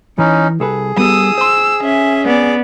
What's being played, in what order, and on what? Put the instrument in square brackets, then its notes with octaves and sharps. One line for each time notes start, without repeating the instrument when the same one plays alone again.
[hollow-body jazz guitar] E3 [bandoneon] C#4 D#4
[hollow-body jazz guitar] C2 A4 B4 [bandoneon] G#4
[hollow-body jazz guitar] G3 B3 A4 [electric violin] D#6 E6
[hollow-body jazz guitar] C5 C6 [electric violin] E6
[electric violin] C#4 [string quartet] E5
[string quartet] B3 D5